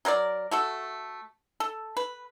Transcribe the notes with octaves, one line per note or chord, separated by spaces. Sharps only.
F#3 A#4 C5 D5
A3 F#4 A4
A4
B4